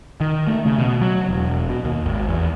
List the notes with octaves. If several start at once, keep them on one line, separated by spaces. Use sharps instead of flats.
D#3
A3
C#3
B2
F#3
E1
B2
D#2
G#1
E2